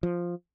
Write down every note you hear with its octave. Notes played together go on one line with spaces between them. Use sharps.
F3